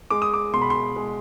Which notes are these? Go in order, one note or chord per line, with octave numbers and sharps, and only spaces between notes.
G#3 D6
D#6
D6
B2 C6
B5
C6
G#3